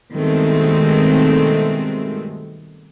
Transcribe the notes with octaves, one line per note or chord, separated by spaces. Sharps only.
G2 B2 D#3 G#3 A3 C4